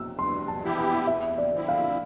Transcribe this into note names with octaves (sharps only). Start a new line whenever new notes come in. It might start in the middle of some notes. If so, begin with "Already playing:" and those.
Already playing: E6
G2 C6
A5
E3 B3 E4 G4
G5
E2 E5
D5
D3 F3 C4 E4
F5